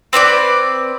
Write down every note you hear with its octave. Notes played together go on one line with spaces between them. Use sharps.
C4 B4 C#5 D5